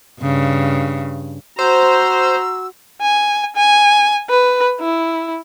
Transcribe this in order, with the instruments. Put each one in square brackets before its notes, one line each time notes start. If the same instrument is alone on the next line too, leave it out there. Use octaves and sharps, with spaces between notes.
[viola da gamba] G2 C#3
[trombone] F#4 [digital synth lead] C5 [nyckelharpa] A#5 C6 [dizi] E6
[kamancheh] G#5
G#5
B4
E4